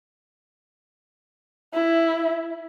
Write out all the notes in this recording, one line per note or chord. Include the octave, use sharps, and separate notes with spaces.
E4